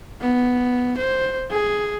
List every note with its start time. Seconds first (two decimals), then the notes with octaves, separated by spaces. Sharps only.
0.21 B3
0.98 C5
1.51 G#4